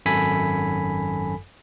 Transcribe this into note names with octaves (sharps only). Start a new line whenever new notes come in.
G#1 F#2 A4 G#5 B5 B6